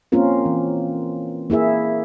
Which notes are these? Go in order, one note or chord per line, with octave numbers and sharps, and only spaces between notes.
A#3 C4 C#4 F4 A#4
E3
A#3 E4 G#4 E5